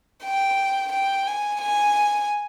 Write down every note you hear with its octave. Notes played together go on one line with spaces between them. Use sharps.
G5
G5
G#5
G#5